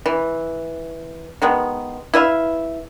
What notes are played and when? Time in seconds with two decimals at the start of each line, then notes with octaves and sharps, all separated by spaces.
0.06 E3
1.42 D#3 G#3 B3
2.14 E4 B4 E5 F5